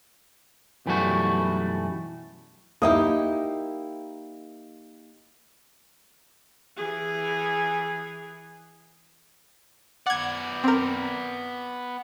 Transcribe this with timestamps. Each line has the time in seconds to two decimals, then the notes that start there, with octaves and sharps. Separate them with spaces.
0.86 B1 F#2 E3 G3 A3 F#4
2.82 A#3 D#4 E4 G4 D#6
6.77 E3 G#4
10.06 B3 D5 F#5 G#6
10.64 C4 A#4